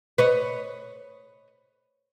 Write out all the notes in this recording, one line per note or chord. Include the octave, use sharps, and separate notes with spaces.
B4 C#5 D#5